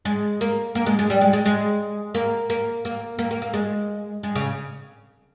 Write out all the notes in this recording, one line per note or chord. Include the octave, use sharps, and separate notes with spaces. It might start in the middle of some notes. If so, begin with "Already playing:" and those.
G#3
A#3
A#3
G#3
G#3
G3
G#3
G#3
G#3
A#3
A#3
A#3
A#3
A#3
A#3
G#3
G#3
C#3